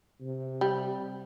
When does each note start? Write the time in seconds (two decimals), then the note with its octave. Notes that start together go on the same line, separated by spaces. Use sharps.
0.21 C3
0.61 G3